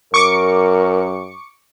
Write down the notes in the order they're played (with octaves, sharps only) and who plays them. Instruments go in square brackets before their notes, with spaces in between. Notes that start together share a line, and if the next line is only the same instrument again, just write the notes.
[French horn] F#2 [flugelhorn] A#4 [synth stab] C#6 D6 C#7